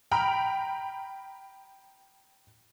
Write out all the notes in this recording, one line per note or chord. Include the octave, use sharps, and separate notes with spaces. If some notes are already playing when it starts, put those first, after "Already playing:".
G5 A#5 B5 F6